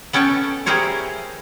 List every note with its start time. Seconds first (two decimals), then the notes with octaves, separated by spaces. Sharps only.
0.13 B3 C#4 A4 G5 A5
0.66 E4 G4 G#4 A#4 C5 C#5